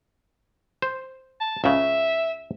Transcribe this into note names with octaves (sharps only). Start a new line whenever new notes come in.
C5
A5
C#2 C#3 E5